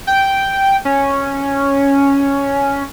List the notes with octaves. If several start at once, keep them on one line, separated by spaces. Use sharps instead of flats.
G5
C#4